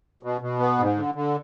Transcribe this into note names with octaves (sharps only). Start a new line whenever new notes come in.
B2
B2
B3
G#2
D3
D3